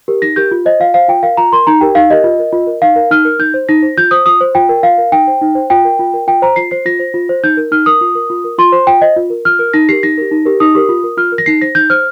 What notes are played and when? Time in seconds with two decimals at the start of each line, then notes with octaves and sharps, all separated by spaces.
0.08 G4 A#4
0.22 D#4 A#6
0.36 G4 A#4 G6
0.51 F4
0.66 C5 D#5
0.80 F4 F5
0.94 C5 F5
1.08 F4 G5
1.23 A#4 F5
1.37 F4 A#5
1.53 A#4 C6
1.67 D#4 A#5
1.81 G4 A#4 G5
1.95 D#4 F5
2.10 G4 A#4 D#5
2.24 F4
2.39 A#4
2.52 F4
2.67 A#4
2.82 D#4 F5
2.96 A#4
3.11 D#4 F6
3.25 A#4
3.39 D#4 G6
3.54 C5
3.69 D#4 A#6
3.82 C5
3.97 F4 G6
4.11 C5 D#6
4.26 F4 D#6
4.41 C5
4.55 F4 G5
4.69 A#4
4.83 F4 F5
4.98 A#4
5.12 D#4 G5
5.27 C5
5.42 D#4
5.55 C5
5.70 F4 G5
5.85 A#4
5.99 F4
6.14 A#4
6.27 F4 G5
6.42 C5 A#5
6.56 F4 C7
6.71 C5 C7
6.85 F4 A#6
6.99 C5
7.14 F4
7.29 C5
7.44 D#4 G6
7.57 A#4
7.72 D#4 F6
7.86 A#4 D#6
8.01 F4
8.15 A#4
8.30 F4
8.44 A#4
8.58 F4 C6
8.72 C5
8.87 F4 G5
9.01 C5 D#5
9.16 F4
9.30 A#4
9.45 F4 F6
9.59 A#4
9.73 D#4 A#6
9.89 G4 A#4 C7
10.03 D#4 A#6
10.18 G4 A#4
10.31 D#4
10.46 G4 A#4
10.60 D#4 D#6
10.75 G4 A#4
10.89 F4
11.04 A#4
11.17 F4 F6
11.32 A#4
11.38 A#6
11.46 D#4 C7
11.61 C5 A#6
11.75 D#4 G6
11.90 C5 F6